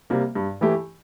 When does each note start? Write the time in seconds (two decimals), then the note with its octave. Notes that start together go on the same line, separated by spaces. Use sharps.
0.10 C3 G3 A#3
0.35 G2
0.61 E3 A3 E4 G4